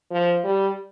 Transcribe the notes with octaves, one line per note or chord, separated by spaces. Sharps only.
F3
G3